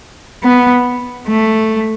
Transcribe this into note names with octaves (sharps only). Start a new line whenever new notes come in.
B3
A3